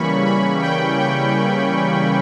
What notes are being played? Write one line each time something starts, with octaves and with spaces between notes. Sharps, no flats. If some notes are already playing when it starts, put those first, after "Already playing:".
Already playing: C#3 E3 G3 A#3 C#4 B5 C#6
B5
G5
G5